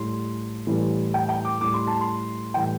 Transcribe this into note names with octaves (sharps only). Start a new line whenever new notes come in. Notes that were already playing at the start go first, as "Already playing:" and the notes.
Already playing: A2 G3 C6
A2 E3 G3
G5
G5
D6
A2 G3 D6
C6
A5
C6
A2 E3 G3 G5